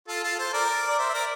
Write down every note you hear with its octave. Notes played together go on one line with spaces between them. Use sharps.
F4 A4
F4 A4
A4 C5
A#4 D5
D5
C5 E5
E5
A#4 D5